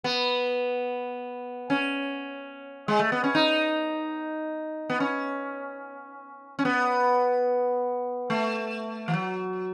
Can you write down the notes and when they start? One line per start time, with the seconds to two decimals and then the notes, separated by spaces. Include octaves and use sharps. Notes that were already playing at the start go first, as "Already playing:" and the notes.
0.04 B3
1.70 C#4
2.88 G#3
2.99 A3
3.12 B3
3.24 C#4
3.35 D#4
4.90 B3
5.00 C#4
6.59 C#4
6.65 B3
8.30 A3
9.08 E3
9.13 F#3